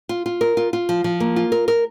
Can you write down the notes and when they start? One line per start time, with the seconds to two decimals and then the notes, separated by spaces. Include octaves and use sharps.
0.09 F4
0.26 F4
0.41 A#4
0.57 F4
0.73 F4
0.89 F3
1.04 F3
1.20 A#3
1.36 F4
1.52 A#4
1.68 A#4